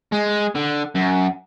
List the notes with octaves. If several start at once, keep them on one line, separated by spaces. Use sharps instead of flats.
G#3
D3
F#2